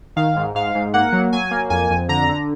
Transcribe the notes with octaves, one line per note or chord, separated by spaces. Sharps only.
D#3 F5
G#2
G#2 F5
G#2
A#3 F#5
F#3
F#3 G#5
A#3
F2 G#5
F2
D3 A#5
D3